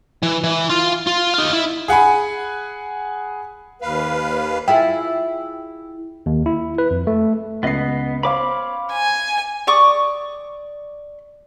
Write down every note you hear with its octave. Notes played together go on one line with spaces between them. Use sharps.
E3
E3
F4 F5
F4
D#4 F5
E4
G#4 F#5 G#5 B5
D#2 B4 F5
E4 F4 G#4 G5 E6
D#2
E4
B4
F2
A3
C#2 B3 D#5 C7
C5 C#5 F5 B5 D6
G#5
D5 C#6 D#6